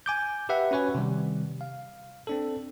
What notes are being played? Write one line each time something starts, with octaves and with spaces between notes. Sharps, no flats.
G#5 D6 G6
G4 B4 E5 F#5
C#4 F#4 B4 C#5 G#5
C3 D#3 G3
F5
C4 D4 A4